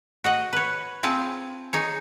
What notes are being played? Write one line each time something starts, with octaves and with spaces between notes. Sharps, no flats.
F#4 D#5 F#5
B4 C#5
C4 F4 G#4 A5
D#4 G#4 C#5